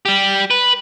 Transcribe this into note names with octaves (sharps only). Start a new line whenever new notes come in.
G3 G4
B4